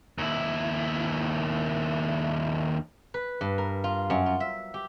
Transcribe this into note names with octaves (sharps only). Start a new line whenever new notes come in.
D#2 E4
B4
G2
A#4
F4
F#2
F4
E5
G4